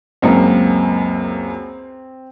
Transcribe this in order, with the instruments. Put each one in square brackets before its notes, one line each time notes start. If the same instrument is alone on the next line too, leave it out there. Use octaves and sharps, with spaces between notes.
[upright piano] C#2 F#2 A#3 [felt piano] C4